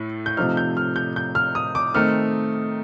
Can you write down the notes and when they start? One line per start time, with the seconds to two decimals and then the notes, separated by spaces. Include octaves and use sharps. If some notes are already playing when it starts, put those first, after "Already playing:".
Already playing: A2 A3
0.26 G6
0.37 C3 F3 A3 D#4 F6
0.57 G6
0.77 F6
0.96 G6
1.16 G6
1.35 F6
1.55 D#6
1.75 D6
1.94 D#3 A3 C4 D#4 F6